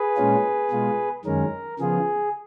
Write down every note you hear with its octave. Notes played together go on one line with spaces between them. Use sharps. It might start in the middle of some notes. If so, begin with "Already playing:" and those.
Already playing: G#4 B4
A#2 G#3 C#4 F4
B2 G#3 B3 F4
F#2 D#3 G#3 C#4 A#4
C#3 F3 B3 F4 G#4